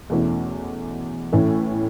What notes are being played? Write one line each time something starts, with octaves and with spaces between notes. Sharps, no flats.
E2 B2 A3 C#4 E4
A2 E3 A3 C#4 E4